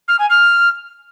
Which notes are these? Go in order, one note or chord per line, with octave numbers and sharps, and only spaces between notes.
F6
G#5
F6